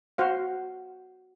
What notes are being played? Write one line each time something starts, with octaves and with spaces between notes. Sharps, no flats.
F#4 C5 F5